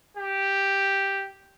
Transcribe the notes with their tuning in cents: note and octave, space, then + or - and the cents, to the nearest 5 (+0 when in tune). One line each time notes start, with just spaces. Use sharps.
G4 +0